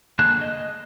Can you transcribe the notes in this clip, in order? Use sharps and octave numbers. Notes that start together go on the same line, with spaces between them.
D3 A#3 G#4 A5 F#6
D#5